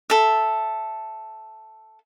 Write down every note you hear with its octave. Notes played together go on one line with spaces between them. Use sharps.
A4 E5